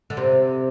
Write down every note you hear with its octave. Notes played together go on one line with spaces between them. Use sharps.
D3
C3